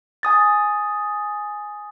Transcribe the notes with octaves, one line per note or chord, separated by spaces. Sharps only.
G#5 D#6 A6